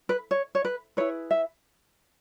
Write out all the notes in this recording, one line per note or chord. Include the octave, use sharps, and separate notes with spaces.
B4
C#5
C#5
B4
E4 G#4 B4 C#5
E5